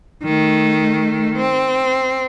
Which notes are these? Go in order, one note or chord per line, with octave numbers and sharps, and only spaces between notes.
D#3 A3
C4